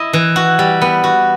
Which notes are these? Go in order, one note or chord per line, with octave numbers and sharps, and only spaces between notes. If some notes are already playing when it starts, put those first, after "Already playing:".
Already playing: E4 D#5
E3
F#4
G3
B3
F#4